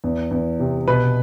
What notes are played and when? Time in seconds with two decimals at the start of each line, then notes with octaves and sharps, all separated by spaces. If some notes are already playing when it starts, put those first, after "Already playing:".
0.04 E2
0.31 E2
0.60 C3
0.87 B2 B4